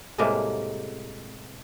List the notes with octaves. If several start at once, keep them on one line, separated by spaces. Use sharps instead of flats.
A2 C3 G3 G#3 A#3